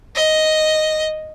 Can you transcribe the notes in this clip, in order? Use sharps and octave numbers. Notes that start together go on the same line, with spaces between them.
D#5